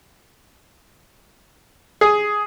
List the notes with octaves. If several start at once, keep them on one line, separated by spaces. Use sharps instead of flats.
G#4